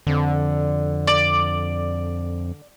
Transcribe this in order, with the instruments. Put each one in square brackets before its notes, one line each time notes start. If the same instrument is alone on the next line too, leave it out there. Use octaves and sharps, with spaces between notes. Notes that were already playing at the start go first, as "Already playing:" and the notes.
[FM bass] F2 [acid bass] D3
[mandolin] D5